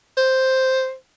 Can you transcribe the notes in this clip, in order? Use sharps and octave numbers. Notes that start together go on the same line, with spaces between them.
C5